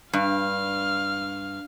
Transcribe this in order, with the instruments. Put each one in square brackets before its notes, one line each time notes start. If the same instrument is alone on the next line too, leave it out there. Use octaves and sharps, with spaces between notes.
[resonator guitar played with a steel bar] G2 [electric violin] F5 F6